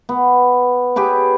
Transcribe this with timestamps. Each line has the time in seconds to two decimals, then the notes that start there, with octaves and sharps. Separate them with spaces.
0.09 B3
0.96 G4 G#4 B4 C#5